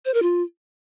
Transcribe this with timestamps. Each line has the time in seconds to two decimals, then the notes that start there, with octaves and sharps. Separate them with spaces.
0.05 C5
0.14 A#4
0.22 F4